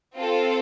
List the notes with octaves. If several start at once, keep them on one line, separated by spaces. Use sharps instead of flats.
C4 F4 A4